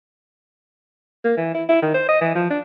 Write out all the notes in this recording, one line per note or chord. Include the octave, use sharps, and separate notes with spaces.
A#3
E3
E4
E4
D#3
C5
D#5
E3
F3
D4